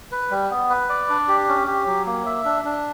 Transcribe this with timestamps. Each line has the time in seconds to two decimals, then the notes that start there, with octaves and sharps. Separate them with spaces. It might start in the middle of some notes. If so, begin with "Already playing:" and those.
0.12 B4
0.31 G3
0.50 B3
0.70 B4
0.89 D5
1.09 D4
1.28 G4
1.48 C#4
1.67 G4
1.87 F#3
2.06 A#3
2.26 E5
2.45 D4
2.65 D4